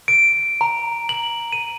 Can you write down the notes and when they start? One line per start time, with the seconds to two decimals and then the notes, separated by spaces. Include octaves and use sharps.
0.08 D7
0.61 A#5
1.09 F#7
1.52 D#7